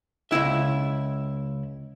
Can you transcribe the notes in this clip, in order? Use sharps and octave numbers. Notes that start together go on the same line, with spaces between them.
C#2 F#2 E4 E5